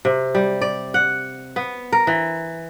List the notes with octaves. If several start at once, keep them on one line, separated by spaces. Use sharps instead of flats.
C3
G3
D5
F#5
B3
A#4
E3